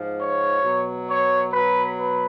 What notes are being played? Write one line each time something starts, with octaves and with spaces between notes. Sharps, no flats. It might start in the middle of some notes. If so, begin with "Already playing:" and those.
Already playing: G#2 F3
C#5
B2 F#3
C#5
B2 F#3 B4
B4